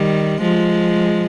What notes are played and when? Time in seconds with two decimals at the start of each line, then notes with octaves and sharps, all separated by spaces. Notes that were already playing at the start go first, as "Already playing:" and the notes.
Already playing: D#3 G3
0.41 F3 G#3